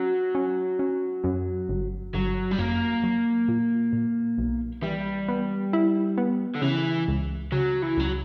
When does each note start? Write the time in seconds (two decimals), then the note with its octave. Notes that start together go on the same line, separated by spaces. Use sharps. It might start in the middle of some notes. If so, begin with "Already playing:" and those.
Already playing: F#3 C#4
0.35 C#4
0.79 C#4
1.24 F#2
1.69 G1
2.13 G1 F#3
2.51 G3
2.58 F#2 A#3
3.04 F#3
3.48 A#2
3.93 A#2
4.38 B1
4.82 E3 G3
5.28 B3
5.73 E4
6.18 B3
6.55 D3
6.62 C#3 E3
7.08 C#2
7.52 C#3 F#3
7.82 E3
7.97 C#2 F#3